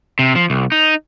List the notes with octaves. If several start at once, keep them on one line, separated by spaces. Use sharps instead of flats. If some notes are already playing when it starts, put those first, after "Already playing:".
C3
F3
C2
D#4